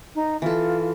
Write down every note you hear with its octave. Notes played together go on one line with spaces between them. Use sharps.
D#4
E3 F4 A4